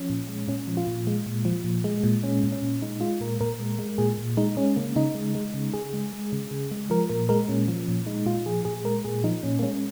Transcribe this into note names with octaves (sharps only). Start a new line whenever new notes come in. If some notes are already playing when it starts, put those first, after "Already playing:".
Already playing: F3 C#4
A#2
G#3
A#2 C#4
F3
F4
A#2
G#3
A#2
F3
A#2
G#3
A#2
G#3 C#4
A#2
C#4
A#2
G#3 D#4
G#3 F4
A#2 A#4
A#2 A#4
G#3
G#3
A#2 G#4
A#2
G#3 D#4
G#3 C#4
C#3 A#3
C#3 D#4
G#3
G#3
C#3
C#3 G#4
G#3
G#3
C#3
C#3
G#3
F3 A#4
A#2 A#4
G#3 A#4
A#2 C#4
F3
A#2
G#3 D#4
A#2 F4
F3 G#4
A#2 G#4
G#3 A#4
A#2 G#4
F3 D#4
A#2 C#4
A#3
G#3 C#4